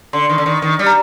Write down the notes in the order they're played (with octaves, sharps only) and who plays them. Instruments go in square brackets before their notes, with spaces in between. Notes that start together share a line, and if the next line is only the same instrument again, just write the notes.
[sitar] D3 [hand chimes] C6
[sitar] D#3
D3
D#3
D#3
G3
[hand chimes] A#5